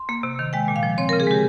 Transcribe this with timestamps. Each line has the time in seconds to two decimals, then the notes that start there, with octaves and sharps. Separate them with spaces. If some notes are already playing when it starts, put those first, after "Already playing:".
Already playing: C6
0.09 A#3
0.23 C3
0.39 D#3
0.53 G#3 G5
0.68 A#2
0.76 F5
0.83 F3
0.98 C4 C#5
1.09 A#4
1.13 C#3
1.20 G#4
1.27 G#3 G4